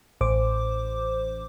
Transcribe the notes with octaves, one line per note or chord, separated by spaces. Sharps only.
A1 C5 D6